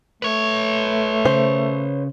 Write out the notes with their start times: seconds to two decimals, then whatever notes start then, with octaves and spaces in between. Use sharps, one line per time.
0.22 A3 B4 C#5
1.25 C#3 C5